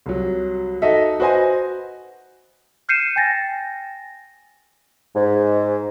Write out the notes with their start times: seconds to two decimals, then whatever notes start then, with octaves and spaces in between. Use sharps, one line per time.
0.06 C2 F#3
0.82 D#4 F#4 A4 D#5 E5
1.20 F#4 B4 C5 D#5 G#5
2.89 F6 G6 C7 C#7 D#7 E7
3.16 G5 G#5 A6 A#6
5.15 G#2